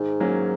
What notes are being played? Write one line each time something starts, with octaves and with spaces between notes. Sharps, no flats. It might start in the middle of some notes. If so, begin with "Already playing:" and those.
Already playing: G#2 D#3
F#3 A#3 C#4